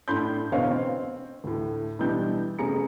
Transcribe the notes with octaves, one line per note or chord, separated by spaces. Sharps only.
A2 D4 B5 C6 G6
E2 B2 D3 C5 C#5 F5
C4
D2 A2
B1 E3 G3 D4 G6
F1 C#4 G#4 A#5 C#7